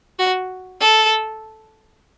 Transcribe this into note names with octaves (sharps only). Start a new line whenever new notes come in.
F#4
A4